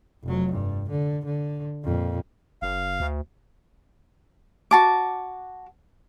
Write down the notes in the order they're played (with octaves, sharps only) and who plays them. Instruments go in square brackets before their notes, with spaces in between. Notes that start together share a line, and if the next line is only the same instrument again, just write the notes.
[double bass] F1 F#3
G2
D3
D3
F2 A#2
[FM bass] F#1 [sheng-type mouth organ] F5
[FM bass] D2
[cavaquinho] F#4 A5 D6